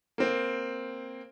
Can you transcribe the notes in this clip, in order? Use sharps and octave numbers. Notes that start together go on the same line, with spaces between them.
A#3 C4